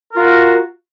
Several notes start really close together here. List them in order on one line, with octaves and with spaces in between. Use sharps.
A#4 F4 F#4